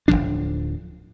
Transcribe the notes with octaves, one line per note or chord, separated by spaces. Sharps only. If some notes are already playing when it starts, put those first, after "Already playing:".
D1 D#2 F3 D4